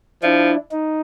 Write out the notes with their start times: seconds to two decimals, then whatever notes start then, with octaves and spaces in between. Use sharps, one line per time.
0.23 F3 D4 E4
0.71 D#4